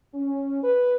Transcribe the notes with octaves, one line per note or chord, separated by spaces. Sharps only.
C#4
B4